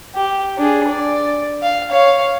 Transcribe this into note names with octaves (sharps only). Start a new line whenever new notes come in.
G4
D4 G#4
D5
F5
C#5 F5